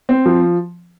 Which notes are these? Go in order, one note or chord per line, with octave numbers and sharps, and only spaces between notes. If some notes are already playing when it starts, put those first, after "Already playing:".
C4
F3